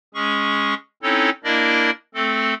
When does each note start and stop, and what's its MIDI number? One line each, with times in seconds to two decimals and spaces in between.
0.15 0.74 56
0.15 0.74 61
0.15 0.74 68
0.15 0.74 85
1.03 1.30 60
1.03 1.30 61
1.03 1.30 63
1.03 1.30 64
1.03 1.30 69
1.03 1.30 73
1.44 1.90 58
1.44 1.90 62
1.44 1.90 64
1.44 1.90 70
1.44 1.90 74
1.44 1.90 75
2.15 2.54 57
2.15 2.54 60
2.15 2.54 69